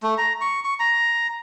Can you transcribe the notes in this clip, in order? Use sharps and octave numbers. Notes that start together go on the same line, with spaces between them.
A3
A#5
C#6
C#6
A#5